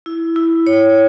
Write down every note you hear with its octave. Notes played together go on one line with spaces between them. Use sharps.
E4
E4
C#5